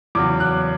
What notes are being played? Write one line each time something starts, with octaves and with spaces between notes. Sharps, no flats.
E2 C#3 F#3 D6
F#6